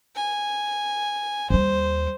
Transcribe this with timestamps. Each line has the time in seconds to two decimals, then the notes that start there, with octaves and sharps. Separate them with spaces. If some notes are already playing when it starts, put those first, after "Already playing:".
0.15 G#5
1.50 D#2 G3 C5